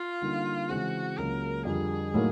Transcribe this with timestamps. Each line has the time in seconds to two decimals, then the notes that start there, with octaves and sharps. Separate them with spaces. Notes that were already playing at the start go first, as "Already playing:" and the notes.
Already playing: F4
0.22 D3 G3 A#3 D#4
0.69 C#3 E3 G#3 C4 F#4
1.18 C#2 C#3 F#3 A#3 A#4
1.65 F2 D3 G3 G#4
2.14 A2 F#3 A#3 D#4